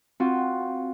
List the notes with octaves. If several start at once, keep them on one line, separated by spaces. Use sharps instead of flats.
C4 F4 F#4